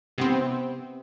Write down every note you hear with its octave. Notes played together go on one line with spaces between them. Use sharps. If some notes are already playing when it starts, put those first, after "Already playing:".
C3 B3 C4